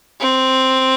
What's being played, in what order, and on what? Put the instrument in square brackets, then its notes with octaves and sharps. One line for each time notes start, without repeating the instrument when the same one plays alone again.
[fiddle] C4